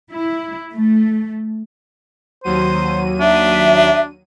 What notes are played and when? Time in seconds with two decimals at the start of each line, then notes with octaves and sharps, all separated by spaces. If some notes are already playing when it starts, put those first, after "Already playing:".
0.11 E4
0.73 A3
2.44 D#2 F#3 C5 D#7
3.20 D4 E5